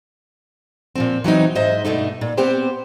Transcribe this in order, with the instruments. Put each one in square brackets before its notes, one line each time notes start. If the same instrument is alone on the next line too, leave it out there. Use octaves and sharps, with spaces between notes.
[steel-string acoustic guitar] A#2 F3 C4
E3 F#3 C4 D#4
G#2 C5 D#5 E5
G2 B2 A3 D#4
A#2
B3 C4 G4 C5